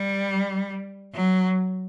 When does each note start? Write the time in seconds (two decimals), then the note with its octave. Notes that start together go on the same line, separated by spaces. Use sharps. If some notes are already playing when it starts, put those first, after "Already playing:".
Already playing: G3
1.14 F#3